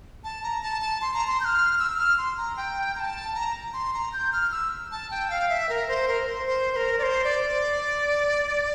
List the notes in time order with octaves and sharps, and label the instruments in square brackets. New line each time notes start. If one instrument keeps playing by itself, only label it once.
[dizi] A5
A#5
A5
A5
C6
A#5
C6
G6
F6
E6
F6
C6
A#5
G5
A#5
A5
A#5
C6
A#5
G6
F6
E6
A5
G5
F5
E5
A#4
C5
A#4
C5
C5
C5
A#4
D5
C5
D5